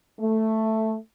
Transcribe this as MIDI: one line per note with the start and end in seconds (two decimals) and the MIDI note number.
0.19 0.95 57